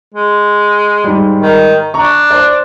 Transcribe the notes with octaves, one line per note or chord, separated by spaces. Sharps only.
G#3
G#2 G3
D#3
D4 A#5 C#6
C5 D5